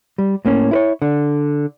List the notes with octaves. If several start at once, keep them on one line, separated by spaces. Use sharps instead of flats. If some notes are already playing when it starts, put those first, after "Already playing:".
G3
A2 A#3 C#4
E4 B4 C#5
D3